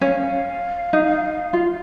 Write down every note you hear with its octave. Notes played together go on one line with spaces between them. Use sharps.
C#4 F5
D#4
F4